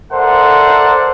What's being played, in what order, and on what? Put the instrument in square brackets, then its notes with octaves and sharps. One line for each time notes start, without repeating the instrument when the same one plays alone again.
[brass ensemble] A4 A#4 C5 D5 E5 F#5